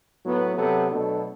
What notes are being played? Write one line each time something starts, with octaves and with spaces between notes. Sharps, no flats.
A2 F#3 B3
C3 F#3 B3 F#4 A4
B2 F#3 A3 D4 A4